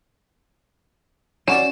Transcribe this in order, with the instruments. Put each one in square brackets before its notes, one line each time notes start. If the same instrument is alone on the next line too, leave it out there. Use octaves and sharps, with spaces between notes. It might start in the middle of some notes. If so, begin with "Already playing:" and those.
[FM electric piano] C#4 F#4 D5 [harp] E7